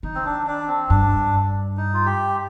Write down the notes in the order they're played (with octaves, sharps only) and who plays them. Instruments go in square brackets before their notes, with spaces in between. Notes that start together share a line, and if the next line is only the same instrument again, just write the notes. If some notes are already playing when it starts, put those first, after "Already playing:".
[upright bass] D#3 [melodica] D#4
[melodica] C4
D4
D4
C4
[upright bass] G2 [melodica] D4
[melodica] D#4
F4
G4